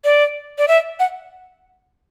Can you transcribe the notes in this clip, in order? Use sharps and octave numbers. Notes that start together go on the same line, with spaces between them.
D5
D5
E5
F#5